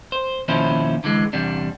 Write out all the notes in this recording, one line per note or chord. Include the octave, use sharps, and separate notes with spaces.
C5
D#2 B2 F3 C#4 E4 C5
D3 E3 G#3
E2 C3 G3 D4